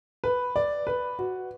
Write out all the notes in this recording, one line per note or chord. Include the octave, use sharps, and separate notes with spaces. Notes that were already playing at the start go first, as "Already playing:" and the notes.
B4
D5
B4
F#4